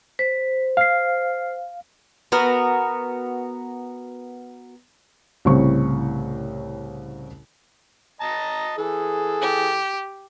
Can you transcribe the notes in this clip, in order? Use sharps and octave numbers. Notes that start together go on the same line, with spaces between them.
C5 B6
F5 F6 C7
B3 F#4 A#4
C2 A2 C#3 C4 C#6
D#5 A5 A#5
E3 G#4 A4
G4